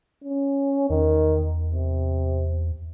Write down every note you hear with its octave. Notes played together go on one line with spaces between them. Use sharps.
C#4
E2 D#3
C3